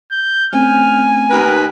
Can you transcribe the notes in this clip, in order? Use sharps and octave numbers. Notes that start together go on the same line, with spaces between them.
G6
A3 C4 C#4 G#5 F6
D#2 A#4 B4